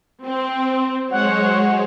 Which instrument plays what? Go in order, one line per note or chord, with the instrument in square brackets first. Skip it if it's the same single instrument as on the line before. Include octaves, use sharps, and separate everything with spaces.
[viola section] C4
[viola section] F#3 C5 C#5 [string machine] G#3 [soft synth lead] F#5